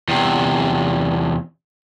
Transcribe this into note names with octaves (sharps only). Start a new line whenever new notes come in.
E2 C3